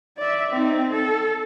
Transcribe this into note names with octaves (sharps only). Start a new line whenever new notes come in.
D5 E5
C4 D#4
A4